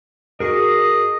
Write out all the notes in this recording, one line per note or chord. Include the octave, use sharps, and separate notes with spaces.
F#4 G#4 A#4 D#5